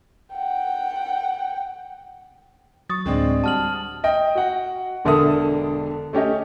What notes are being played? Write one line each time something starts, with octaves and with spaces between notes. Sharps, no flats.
F#5 G5
F#3 C#6 D#6 A6
D2 A2 G#3 C4 D4
G3 F#4 A5 F6 F#7
D#5 G5
F#4 F#5
E1 D3 A4 A#4 E5 D#6
A3 C#4 G4 D#5